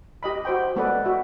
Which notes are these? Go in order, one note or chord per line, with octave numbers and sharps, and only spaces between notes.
G4 D#5 B5
F#4 C5 G5
G#3 B3 A4 B4 D5
F#4 E5